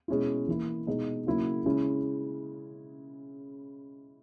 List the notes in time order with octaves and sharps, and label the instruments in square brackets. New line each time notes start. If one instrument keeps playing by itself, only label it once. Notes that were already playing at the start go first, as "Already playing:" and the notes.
[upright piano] B2 G#3 C#4 E4
E3 A#3 E4
B2 G#3 D#4
C#3 F#3 A#3 E4
C#3 G#3 C#4 E4